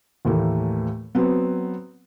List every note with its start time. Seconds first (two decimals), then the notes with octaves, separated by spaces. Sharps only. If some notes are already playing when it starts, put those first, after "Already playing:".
0.25 D#2 A2 E3 A3 A#3
1.15 F#3 B3 C4